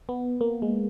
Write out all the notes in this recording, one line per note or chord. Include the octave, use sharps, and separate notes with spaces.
B3
A#3
G#3